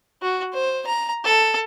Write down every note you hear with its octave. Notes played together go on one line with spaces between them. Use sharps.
F#4
C5
A#5
A4